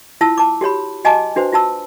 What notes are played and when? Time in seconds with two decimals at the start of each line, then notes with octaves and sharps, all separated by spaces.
0.21 E4 F4 A5 E6
0.38 A5 D6
0.61 F#4 G4 C#5 B5
1.04 F#4 D#5 G#5 A5 D6
1.36 D4 F#4 B4 C5
1.52 F4 F#4 A5 E6